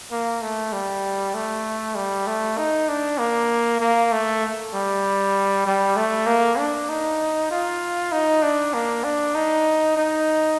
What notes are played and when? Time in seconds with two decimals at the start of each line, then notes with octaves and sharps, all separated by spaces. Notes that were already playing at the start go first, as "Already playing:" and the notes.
0.12 A#3
0.42 A3
0.73 G3
1.34 A3
1.95 G3
2.27 A3
2.58 D#4
2.89 D4
3.19 A#3
3.81 A#3
4.12 A3
4.74 G3
5.66 G3
5.96 A3
6.27 A#3
6.58 D4
6.89 D#4
7.51 F4
8.12 D#4
8.43 D4
8.74 A#3
9.04 D4
9.35 D#4
9.97 D#4